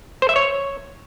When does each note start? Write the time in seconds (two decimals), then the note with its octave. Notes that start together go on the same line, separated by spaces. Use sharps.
0.22 C5
0.29 E5
0.36 C#5